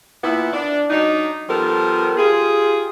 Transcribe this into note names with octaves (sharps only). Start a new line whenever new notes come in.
A#2 B3 E4
D4
F#3 D4 D#4
F3 G3 B3 A4 A#4
F4 G4 G#4